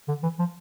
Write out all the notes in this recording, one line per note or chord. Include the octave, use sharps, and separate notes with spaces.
D3
E3
F3